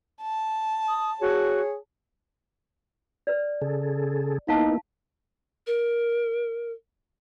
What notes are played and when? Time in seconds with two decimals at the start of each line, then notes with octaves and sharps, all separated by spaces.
0.22 A5
0.88 D#6
1.21 F#4 G#4 C#5
3.27 B4 D5
3.62 C#3 G#4 A4
4.48 A#3 B3 D#4 E4 F5 A5
5.67 A#4